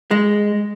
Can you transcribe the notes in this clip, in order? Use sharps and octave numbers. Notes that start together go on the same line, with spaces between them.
G#3